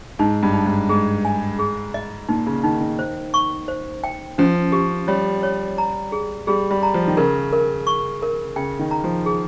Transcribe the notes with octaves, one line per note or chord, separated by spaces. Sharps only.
G#2 D#4
G2
D#4
G#2
G#2 G#4
G#5
G#4
D#5
A#2 D#4
C#3
D#3 D#4
D#3
C5
C#6
C5
G5
F3 C#4
G4
G3 C#5
C#5
A#5
G#4
G3 G#4
G3
A#5
F3
D#3
C#3 A#4
A#4
C#6
A#4
C#3 G5
D#3
A#5
F3
G#4